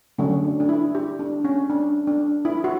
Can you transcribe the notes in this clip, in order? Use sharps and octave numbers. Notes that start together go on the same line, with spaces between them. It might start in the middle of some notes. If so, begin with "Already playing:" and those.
D3 F#3 A3 C#4 D4
D4
D4
E4
G4
D4
C#4
D4
D4
E4
F#4